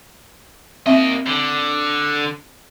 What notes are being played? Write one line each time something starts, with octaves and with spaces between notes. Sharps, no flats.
A#3 C4 D#5 E5
D3